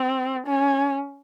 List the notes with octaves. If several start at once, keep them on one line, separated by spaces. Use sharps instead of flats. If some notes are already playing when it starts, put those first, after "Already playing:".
Already playing: C4
C#4